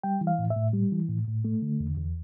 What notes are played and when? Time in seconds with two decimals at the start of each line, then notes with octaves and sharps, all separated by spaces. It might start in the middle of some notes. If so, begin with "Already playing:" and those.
0.04 G3 G5
0.21 E3
0.27 F5
0.39 A2
0.50 E5
0.56 A2
0.73 G3
0.92 E3
1.09 A2
1.27 A2
1.45 A3
1.62 D3
1.80 E2
1.97 E2